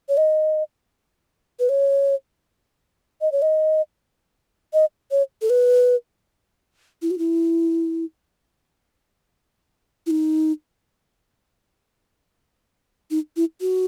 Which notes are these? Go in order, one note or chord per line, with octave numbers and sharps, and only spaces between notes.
C#5
D#5
B4
C#5
D#5
C#5
D#5
D#5
C#5
A4
B4
E4
F#4
E4
E4
D#4
D#4
E4
F#4